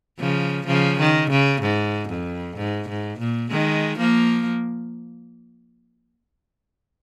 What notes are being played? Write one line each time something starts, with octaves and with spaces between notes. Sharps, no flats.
C#3 F3
C#3 F3
D#3
C#3
G#2
F2
G#2
G#2
A#2
D#3 G#3
F3 A#3